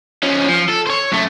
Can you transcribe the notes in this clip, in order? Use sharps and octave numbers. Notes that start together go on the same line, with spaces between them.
F3 C#4
F3
A4
C5 C#5
F#2 A3